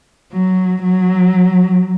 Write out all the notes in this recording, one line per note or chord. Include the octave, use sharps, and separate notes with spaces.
F#3
F#3